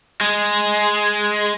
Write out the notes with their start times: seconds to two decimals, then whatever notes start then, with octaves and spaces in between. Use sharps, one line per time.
0.21 G#3